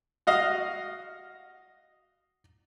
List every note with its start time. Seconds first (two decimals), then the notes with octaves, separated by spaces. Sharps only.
0.27 F#4 D#5 F5